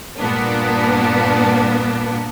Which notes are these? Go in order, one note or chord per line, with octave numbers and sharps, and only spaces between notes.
G2 A#2 A#3 B3 D4